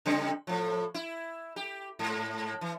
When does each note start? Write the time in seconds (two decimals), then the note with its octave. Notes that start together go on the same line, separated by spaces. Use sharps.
0.06 C#3 G3 C4
0.47 A2 F3
0.94 E4
1.56 G4
1.99 G#2
2.61 E3